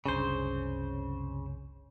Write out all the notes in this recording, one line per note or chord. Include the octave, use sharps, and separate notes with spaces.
F#1 C2 C#3 D4 C5